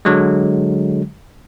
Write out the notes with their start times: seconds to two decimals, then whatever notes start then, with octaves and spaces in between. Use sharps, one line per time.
0.05 D3 F#3 G#3